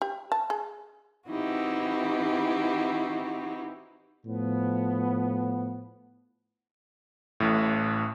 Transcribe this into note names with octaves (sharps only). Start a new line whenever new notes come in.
G4
A5
G#4
E3 C4 D#4 E4 F#4 G4
A2 F3 B3
A1 A2